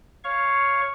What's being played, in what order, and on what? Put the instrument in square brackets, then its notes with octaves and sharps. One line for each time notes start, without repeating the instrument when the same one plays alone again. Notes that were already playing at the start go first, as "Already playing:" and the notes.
[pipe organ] C#5 F5 C#6